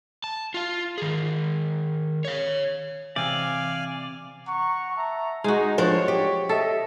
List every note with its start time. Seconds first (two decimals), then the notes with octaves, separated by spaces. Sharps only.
0.24 A5
0.54 F4 F5
0.98 D#3 G#4
2.25 C#5 F5
3.16 C3 E3 D5 F5 G#5
4.47 F#5 A#5 C#6
4.96 E5 A5 A#5
5.44 G#3 D#4 F#4
5.78 F3 D4 C5 C#5
6.08 G4
6.49 A4 D#5 E5